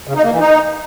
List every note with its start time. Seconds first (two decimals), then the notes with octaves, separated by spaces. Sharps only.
0.07 C#3
0.16 D#4
0.24 A#3
0.32 E3
0.40 D#4